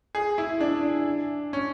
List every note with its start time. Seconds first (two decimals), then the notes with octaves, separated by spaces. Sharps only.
0.15 G#4
0.38 E4
0.61 D4
1.53 C#4